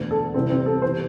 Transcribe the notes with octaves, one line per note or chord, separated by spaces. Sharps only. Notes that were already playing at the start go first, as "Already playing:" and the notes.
Already playing: E1 D2 D3
A4
C2 C3 E3 G3 C4
C4
A4
E1 E3 G3 C5